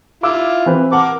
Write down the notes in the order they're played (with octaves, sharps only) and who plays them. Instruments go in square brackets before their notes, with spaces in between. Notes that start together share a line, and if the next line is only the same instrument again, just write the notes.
[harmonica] E4 F4 [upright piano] F5 D6 E6
[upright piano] E3 C4 B4
[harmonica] A#4 D6 [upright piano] F#5 A5